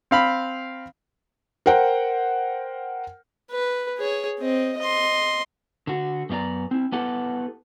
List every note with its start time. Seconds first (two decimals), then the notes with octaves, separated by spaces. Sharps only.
0.11 C4 F5 B5
1.66 A#4 C5 F#5 G5
3.51 B4
3.98 G#4 C#5
4.40 C4 D#5
4.78 D#5 C6
5.87 D3 F#4
6.29 F#2 B3 F4 D5 A#5
6.71 C4 E4
6.92 B3 E4 G4 A4 B4 F#5